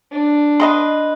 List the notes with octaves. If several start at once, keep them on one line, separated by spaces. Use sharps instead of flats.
D4
B4 D#5 C6